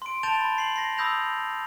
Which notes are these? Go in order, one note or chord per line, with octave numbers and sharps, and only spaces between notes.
C6 D7
A5 G6 A6 D7 F7 G7
B5
C7 F#7
A#6 C7
B5 D#6 E6 G6 A#6 F7